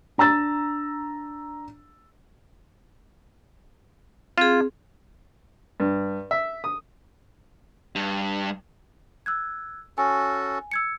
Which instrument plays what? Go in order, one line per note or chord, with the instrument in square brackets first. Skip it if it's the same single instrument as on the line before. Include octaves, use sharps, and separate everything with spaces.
[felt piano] D4 A#5 E6 A6
[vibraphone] C4 G#4 [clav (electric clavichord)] F4
[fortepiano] G2
E5
D#6
[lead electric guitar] G2
[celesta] E6 F#6 G#6
[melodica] C#4 F#4 A4 [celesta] G#5
[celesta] E6 G#6 C#7